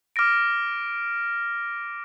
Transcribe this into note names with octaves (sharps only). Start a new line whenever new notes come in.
D6 F6 A#6 D7